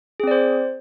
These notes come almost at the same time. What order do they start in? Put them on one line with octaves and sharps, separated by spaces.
G#4 C4 D5 C5